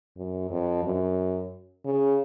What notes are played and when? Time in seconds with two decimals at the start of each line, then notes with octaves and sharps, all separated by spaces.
0.17 F#2
0.50 F2
0.84 F#2
1.86 C#3